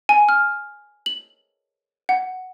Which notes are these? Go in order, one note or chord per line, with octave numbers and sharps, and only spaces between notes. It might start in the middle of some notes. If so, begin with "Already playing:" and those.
G#5
F6
F#7
F#5